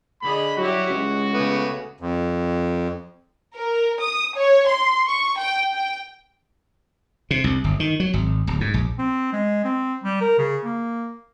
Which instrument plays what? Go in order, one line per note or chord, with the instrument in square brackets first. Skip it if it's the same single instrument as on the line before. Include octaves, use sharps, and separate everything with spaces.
[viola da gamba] D3 G#4 D#5 [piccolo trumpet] B5
[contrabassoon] F#3 [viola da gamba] G3 E4 G4 [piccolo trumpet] F#4
[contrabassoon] C#2 [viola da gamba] G#3
[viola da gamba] C#3 G#4 [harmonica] A3 B3 D6
[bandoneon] F2
[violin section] A#4
D#6
C#5
C6
C#6
G5
G5
[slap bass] C3
C2
G1
D#3
F#3
G#1
D1
G#2
A#1
[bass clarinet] C4
G#3
C4
G3
A#4
C#3
A#3